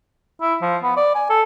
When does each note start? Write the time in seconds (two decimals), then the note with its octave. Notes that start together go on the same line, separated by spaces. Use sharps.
0.41 E4
0.61 F3
0.83 B3
0.97 D5
1.15 G#5
1.30 A4